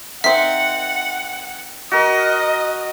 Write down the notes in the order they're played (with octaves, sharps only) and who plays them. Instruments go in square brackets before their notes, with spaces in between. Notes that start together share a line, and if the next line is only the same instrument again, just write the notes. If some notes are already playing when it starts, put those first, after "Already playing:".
[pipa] D#3 C4 [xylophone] E5 B6 [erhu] F#5
[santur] F#4 A#4 [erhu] D#5